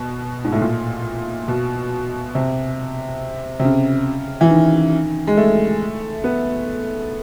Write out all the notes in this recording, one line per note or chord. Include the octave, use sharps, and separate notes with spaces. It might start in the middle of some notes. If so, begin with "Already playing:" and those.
Already playing: B2
G#2
A2
A#2
B2
C3
C3
C#3
E3
D#3
G#3
A3
B3